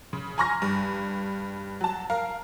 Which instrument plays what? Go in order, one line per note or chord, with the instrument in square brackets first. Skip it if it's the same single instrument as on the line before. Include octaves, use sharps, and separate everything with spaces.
[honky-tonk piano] C#3
G#5 A#5 C6 C#6 F6 A#6
G2
F#3 A5
A#4 F5